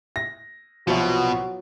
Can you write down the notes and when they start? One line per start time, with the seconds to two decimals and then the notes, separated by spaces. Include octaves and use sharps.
0.16 A#6
0.87 C2 B2 F3 F#3 B3 F4 F#4